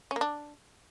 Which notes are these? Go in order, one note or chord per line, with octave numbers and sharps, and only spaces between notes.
C#4
A#3
D4